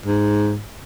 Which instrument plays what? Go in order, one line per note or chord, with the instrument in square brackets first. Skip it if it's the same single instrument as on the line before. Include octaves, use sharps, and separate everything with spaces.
[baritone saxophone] G#2